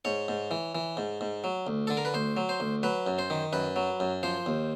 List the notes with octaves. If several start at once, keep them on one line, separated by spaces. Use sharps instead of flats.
G#2 C#5
G#2
E3
E3
G#2
G#2
F#3
D2
D3 A4
A#4
B4
D2 C5
F#3
C5
D2
F#3 B4
F#2
C5
D#3
F#2 B4
F#3
F#2
F3 C5
D#2